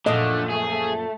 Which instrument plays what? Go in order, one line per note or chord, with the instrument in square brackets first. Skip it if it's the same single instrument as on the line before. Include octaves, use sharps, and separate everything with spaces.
[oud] F#2 A#2 F3 [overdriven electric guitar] D3 [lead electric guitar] A3 [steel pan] D#5
[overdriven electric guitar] G#4